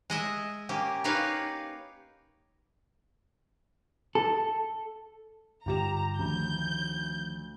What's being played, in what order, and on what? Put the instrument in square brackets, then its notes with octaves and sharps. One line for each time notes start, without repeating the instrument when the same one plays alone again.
[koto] G#3 D#5 E5
A#3 C#4 G4
A#3 D#4 G4 B4 C#5 F5
[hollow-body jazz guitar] A4
[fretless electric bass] G2 D3 [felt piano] F4 G4 E7 [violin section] A#5
[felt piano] D2 [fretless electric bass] D#3 F3 [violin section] G6